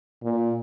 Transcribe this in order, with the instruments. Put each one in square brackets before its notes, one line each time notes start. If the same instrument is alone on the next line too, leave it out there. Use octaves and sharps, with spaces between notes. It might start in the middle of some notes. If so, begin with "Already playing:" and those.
[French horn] A#2